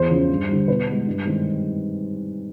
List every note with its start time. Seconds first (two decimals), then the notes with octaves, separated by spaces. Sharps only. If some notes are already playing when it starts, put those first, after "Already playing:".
Already playing: E2 C5
0.10 C#3 F3
0.29 G2
0.49 D3 G3
0.68 B2 B4
0.87 G#3 B3
1.07 G2
1.26 D#3 G#3 C4